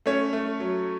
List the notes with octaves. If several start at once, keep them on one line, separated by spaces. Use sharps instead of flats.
A3 C#4 C#5
A3
F#3